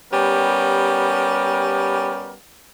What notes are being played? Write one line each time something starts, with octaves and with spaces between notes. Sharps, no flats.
G3 B3 C#4 G4 A#4